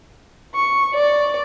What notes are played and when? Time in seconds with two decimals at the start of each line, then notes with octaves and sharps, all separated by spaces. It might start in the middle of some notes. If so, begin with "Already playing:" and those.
0.54 C#6
0.95 D5